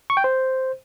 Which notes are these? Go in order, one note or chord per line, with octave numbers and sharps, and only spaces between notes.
C#6
G5
C5